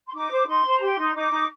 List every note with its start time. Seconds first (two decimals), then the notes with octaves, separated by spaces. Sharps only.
0.07 C6
0.13 D#4 D6
0.30 C5
0.46 D#4 C6
0.64 C5
0.77 A#5
0.80 G4 C6
0.97 D#4
1.15 D#4 D6
1.31 D#4